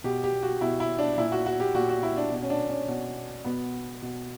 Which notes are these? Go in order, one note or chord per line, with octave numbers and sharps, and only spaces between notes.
B2 G4
G4
F#4
B2 E4
E4
D4
A#2 E4
F#4
F#4
G4
A#2 F#4
F#4
E4
D4
B2
C#4
D4
C#4
B2
B2 B3
B2